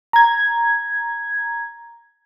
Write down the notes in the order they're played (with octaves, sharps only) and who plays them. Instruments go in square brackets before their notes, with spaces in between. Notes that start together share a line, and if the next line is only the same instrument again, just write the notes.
[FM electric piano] A#5 G#6